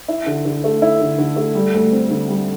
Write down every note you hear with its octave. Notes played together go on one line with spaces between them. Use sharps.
E4
D3
D3
A3
E4
D3
D3
A3
G3
D2
C4
D3
G3